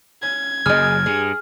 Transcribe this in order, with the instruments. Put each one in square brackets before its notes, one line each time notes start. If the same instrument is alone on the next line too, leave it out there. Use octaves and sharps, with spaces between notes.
[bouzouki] C#4 [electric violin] G#6
[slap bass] F#1 F#2 [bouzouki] G#4 D#5 [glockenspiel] F6
[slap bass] G2 [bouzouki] G#4